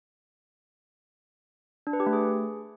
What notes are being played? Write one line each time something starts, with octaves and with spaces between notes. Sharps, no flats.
D4
B4
G4
A3
G#4